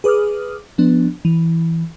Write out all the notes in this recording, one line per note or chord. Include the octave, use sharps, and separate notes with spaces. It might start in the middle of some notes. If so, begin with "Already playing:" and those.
G#4 B4 D6 D#6 F6
F3 B3 D4
E3